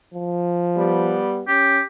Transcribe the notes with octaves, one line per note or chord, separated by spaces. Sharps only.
F3
G3 B3
C#4 G4